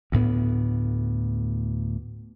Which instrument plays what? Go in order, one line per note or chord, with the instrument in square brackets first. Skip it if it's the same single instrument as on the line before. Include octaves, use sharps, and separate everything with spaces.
[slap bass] D2 A2 B3